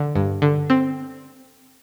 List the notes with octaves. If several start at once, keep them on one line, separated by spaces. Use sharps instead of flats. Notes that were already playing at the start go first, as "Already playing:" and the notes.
Already playing: D3
G2
D3
C4